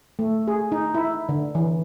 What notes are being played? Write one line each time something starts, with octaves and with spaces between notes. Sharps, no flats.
A3
G#4
D#4
E4
D3
E3